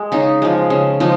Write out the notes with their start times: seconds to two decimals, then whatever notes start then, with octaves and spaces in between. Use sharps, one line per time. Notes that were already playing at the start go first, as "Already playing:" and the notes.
Already playing: G#3
0.12 C#3 D#4
0.42 F3 G#3
0.70 C#3
1.00 F3 G#3 D#4